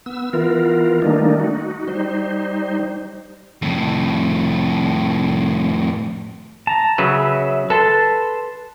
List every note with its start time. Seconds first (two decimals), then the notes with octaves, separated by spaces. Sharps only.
0.06 B3 E6
0.33 E3 B3 F4 A#4
1.02 D#3 G3 A3 A#3 D4 D#4
1.39 D#4 F#4
1.88 G3 D#4 C5
3.62 F2 A2
6.67 A5 A#5
6.98 C#3 F#3 B4 E5
7.70 A4 B4 A5 C6